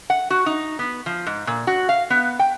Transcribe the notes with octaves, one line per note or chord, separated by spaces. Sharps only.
F#5
F#4
D#4
B3
F3
G#2
A#2
F#4
F5
B3
G5